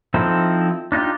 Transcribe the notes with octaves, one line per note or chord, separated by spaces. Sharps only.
F3 C4 D#4 E4 A4
D4 D#4 F4 G4